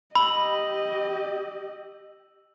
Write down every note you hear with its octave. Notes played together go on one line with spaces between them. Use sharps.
G4 D#5 B5 E6 F#7